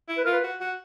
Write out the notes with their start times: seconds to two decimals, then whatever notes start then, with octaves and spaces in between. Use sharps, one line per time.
0.09 E4
0.17 B4
0.25 F4 A#4
0.32 B4
0.43 F#4
0.60 F#4